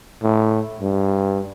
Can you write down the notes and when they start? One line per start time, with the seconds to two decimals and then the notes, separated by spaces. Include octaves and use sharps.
0.23 A2
0.81 G2